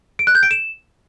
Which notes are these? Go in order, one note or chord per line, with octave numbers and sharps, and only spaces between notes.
D7
F#6
G6
D7
E7